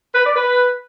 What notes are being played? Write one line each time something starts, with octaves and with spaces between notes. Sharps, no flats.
B4
D5
B4